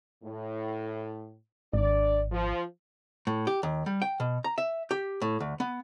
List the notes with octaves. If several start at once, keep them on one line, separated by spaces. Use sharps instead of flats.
A2
G#1 D4 D5
F3
A2
G4
D#2
G3
G5
B2
A#5
E5
G4
A2
D2
B3